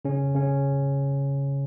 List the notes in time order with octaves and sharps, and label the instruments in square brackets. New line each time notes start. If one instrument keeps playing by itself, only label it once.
[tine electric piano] C#3 C#4
C#3 C#4